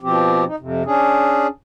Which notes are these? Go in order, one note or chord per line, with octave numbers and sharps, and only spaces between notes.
B2 F3 C4 G4
D#4
F2 C3
C#4 D4 G#4